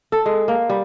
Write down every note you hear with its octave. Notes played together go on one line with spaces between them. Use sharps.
A4
G#3
A#3
G3